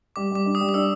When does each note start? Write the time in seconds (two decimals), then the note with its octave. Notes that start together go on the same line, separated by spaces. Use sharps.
0.16 G3 D6
0.31 G3 D6
0.46 D4
0.55 D#6
0.61 G3
0.69 D#6
0.74 D4 E6